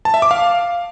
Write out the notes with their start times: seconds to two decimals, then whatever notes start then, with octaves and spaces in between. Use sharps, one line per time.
0.05 A5
0.14 E5
0.22 D6
0.31 F5